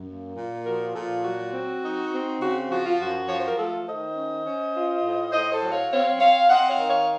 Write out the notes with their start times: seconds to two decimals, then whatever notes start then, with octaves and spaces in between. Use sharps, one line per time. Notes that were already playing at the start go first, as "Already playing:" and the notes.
Already playing: F#2
0.08 A#3
0.36 A#2
0.65 F3 F#4 A#4
0.95 A#2 F4 A4
1.24 F#3 F#4
1.53 C4
1.83 D#4
2.12 C4
2.41 C#3 F#4
2.70 F3 F#4
2.85 F4
3.00 F#2 F#4
3.28 F3 C#5
3.39 C5
3.48 A#4
3.57 A3 F4 A4
3.87 D#3 C5 D#5
4.16 C#4
4.45 C#4
4.75 F4
5.04 A2
5.32 A2 C5 D#5
5.52 A4 C5
5.62 F#3
5.72 C#5 F5
5.91 C4 C#5 F5
6.20 C4 C#5 F5
6.50 C4 D#5 F#5
6.69 C#5 F5
6.79 D#3
6.88 C#5 F5